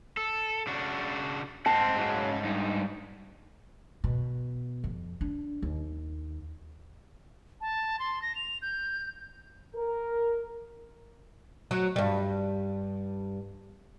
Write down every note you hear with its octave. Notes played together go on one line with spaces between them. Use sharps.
A4
C#3 D4 F#4
G#2 C4 D#5 F#5 A5
C#3 F#3
G2 D#4
B2
F2
D4
D#2
A5
C6
A#6
F7
G6
A#4
F#3
G2 G3